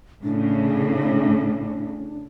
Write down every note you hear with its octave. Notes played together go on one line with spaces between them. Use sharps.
A2 C#3 D4